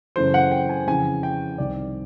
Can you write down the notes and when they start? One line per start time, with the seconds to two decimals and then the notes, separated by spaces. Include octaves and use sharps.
0.16 F#2 C#3 E3 A3 C5
0.34 F#5
0.52 G5
0.69 G#5
0.87 F2 C#3 E3 G#5
1.23 G5
1.58 C2 C3 D#3 D5